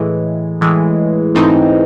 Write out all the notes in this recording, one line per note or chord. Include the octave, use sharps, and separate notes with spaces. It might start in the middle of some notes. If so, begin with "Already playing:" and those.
Already playing: A2 E3 G#3
A2 E3 G#3
G#2 E3 A3 C4 D#4